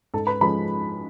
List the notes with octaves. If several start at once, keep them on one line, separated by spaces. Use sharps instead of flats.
G#2 A4 A5
B4 B5
F3 G#3 C#4 B4 B5